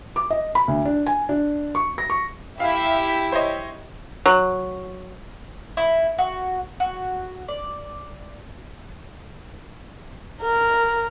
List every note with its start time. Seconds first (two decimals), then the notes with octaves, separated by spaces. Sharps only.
0.16 D6
0.30 D#5
0.55 B5
0.68 D2
0.85 D4
1.06 G#5
1.29 D4
1.75 C#6
1.98 A#6
2.10 C#6
2.60 E4 G4 E5 F5
3.32 C5 C#5 D#5
4.26 F#3
5.77 E4
6.19 F#4
6.80 F#4
7.48 D5
10.42 A#4